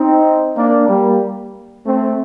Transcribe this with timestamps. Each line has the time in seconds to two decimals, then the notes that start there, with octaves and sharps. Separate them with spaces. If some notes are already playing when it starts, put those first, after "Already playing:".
Already playing: C4 D#4
0.56 A#3 D4
0.89 G3 A#3
1.85 A3 C4